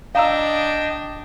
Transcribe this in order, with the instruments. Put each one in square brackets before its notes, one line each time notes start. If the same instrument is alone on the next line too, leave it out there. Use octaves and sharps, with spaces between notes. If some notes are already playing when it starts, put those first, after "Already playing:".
[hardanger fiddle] D4 [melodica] D#5 G5 [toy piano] F5 A#5 E6